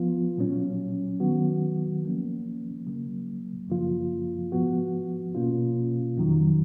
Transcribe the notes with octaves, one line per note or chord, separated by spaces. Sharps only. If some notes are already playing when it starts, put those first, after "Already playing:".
Already playing: F3 B3 F4
A#2 F#3 C#4
D#3 F#3 B3 F#4
F3 A#3 C#4
C#3 F#3 A#3
F#2 C#3 F3 A#3 F4
G#2 F3 B3 F#4
B2 A#3 C#4 F4
F2 D#3 F#3